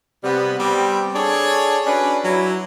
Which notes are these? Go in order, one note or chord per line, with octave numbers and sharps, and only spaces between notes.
C3 G3 B3
G3 B3 C4
D4 G#4 A4 C#5
C#4 D4 F#4 B4
F#3 E4